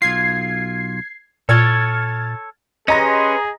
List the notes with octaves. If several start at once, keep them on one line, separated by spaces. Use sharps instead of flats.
B1 F4 G#6 C7
A#2 A4 C#5 F6 G#6 A6
C#4 G4 G#4 B4 D#5 A#5 C6 A#6